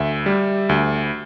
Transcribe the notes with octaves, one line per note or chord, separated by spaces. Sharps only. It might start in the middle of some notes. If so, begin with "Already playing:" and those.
Already playing: D2 E5
G3
D2